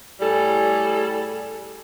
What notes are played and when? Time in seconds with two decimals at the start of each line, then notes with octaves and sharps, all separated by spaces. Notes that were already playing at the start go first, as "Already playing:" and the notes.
0.21 A2 G3 G#4 A4